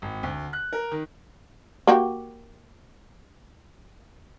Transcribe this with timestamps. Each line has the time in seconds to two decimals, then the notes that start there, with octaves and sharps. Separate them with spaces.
0.02 G#1
0.23 D2
0.53 F#6
0.73 A#4
0.92 D#3
1.87 A#3 F#4 G4